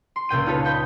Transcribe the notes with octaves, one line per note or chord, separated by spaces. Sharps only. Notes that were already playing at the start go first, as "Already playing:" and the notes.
C6
C#2 A#2 G5 D#7
D#4 F4 A4 B4 C#5
D#5 G5 B5